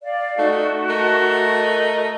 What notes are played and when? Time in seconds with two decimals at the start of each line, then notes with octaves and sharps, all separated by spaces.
0.02 D5 F5
0.38 A3 D#4 F#4
0.89 A3 A#4 D#5